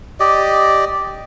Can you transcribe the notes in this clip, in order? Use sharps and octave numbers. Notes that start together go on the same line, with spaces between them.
G4 D5 D#5